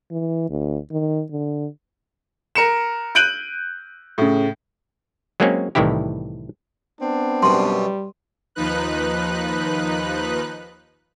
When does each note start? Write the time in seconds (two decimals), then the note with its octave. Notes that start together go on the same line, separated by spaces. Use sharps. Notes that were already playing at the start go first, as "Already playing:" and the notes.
0.11 E3
0.50 D2
0.92 D#3
1.31 D3
2.55 A#4 C#7 E7
3.15 F#6 G6 D7 D#7 F#7
4.18 A2 C#3
5.40 F#3 G#3 A#3 C4 C#4
5.75 C2 A2 D#3 E3 E4 G4
7.01 B3 C4 D4
7.43 F#2 B2 G3 C6
8.55 D#2 F3 D#4 B4 F#6